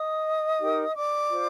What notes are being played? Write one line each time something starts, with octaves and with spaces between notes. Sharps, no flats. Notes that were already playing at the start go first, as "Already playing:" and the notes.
Already playing: D#5 D#6
D#4 G4 A#4
D5 D6
F4 C5